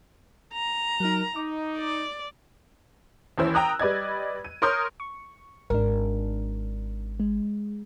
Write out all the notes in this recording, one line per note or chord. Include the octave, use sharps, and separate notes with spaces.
A#5
F#3 D#4 A#4
D#4 D6
D5
D#2 E3 C#4 E4 C5 E6
G5 A#5 D#6 F#6
G3 B4 D5 D#5 G#6
D#7
A#4 C#5 C6 D#6 F6 G6
C#6
G#1 D4 A#4
G#3